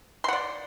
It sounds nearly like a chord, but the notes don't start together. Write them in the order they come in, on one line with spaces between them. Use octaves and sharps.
C6 F#5 D5